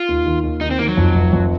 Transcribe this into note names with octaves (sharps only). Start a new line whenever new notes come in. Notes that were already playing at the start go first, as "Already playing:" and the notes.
Already playing: F4
D#2
D#3
D#2
D#3 D#4
C4
D#3 A#3
F#3
F2
F1
F2